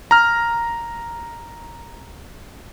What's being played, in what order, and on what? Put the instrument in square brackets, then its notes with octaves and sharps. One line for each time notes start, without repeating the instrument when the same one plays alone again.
[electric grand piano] A#5 F6